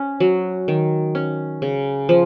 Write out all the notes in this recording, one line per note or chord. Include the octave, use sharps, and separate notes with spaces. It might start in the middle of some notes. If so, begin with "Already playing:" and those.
Already playing: C#4
F#3
D#3
C#4
C#3
F3